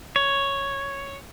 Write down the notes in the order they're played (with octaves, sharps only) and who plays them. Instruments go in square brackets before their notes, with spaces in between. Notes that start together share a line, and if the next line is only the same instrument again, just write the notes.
[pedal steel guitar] C#5